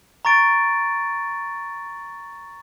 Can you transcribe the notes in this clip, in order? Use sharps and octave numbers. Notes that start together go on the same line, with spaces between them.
A#5 C#6 A6 D7